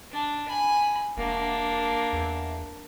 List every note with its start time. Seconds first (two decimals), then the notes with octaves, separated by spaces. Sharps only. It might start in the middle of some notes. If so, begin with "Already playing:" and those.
0.12 D4
0.48 G#5 B5
1.17 E1 A#3 D4
2.13 E2